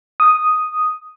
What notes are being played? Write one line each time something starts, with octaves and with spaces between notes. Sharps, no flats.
D#6